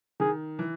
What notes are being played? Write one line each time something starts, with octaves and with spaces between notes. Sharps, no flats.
D#3 G#4
E3